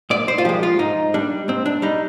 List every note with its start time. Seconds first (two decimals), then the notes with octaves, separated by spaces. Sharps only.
0.10 G#2 D5
0.28 C5
0.38 F4
0.45 F3 G#3 G4
0.63 F4
0.79 G#2 D#4
1.14 G3 D4
1.48 G#2 C4
1.66 D4
1.82 G3 D#4